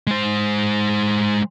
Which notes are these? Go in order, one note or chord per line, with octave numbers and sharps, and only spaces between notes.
G#3 C5